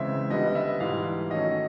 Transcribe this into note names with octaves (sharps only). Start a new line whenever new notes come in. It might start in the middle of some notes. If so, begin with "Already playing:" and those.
Already playing: C#3 E3 G#3 C4 E5
D3 G3 B3 D#5
D#5
E5
G#2 E3 G3 F5
D#3 F#3 A3 C#4 D#5